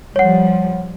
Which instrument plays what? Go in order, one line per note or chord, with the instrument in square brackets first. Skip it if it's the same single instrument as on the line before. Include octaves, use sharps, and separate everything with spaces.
[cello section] F3 G3 [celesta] C#5 F#5